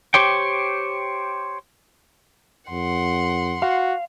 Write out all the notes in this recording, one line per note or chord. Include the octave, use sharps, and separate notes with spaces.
G4 C5 C#5 G5
F2 F#5 C6
F#4 F5